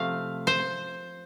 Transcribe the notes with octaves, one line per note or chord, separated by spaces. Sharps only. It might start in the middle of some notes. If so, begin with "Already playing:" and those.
Already playing: C3 F3 A3 F5
C5